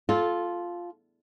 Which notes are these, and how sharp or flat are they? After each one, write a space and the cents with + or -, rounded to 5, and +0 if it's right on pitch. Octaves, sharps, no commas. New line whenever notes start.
F4 +0 A4 -20